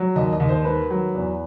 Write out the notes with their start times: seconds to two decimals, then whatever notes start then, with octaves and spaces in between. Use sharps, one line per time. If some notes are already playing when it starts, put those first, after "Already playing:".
Already playing: F#3
0.16 D#2 D#5
0.33 D#5
0.40 D#2
0.49 C5
0.65 D#3 B4
0.90 F#3
1.14 E2